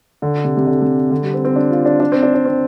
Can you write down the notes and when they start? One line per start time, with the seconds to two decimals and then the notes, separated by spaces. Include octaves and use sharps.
0.22 D3
0.45 C3
0.57 C3
0.67 D3
0.82 C3
1.11 D3
1.22 G3
1.34 C4
1.45 C4
1.56 D4
1.70 F4
1.86 D4
2.00 D4
2.12 C4
2.23 D4
2.34 D4
2.45 C4